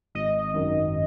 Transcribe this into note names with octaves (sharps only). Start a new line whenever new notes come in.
G#1 D#5
F#2 D#3